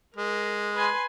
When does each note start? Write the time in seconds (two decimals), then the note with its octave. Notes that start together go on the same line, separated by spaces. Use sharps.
0.17 G#3 A#4
0.74 B4 G#5 C6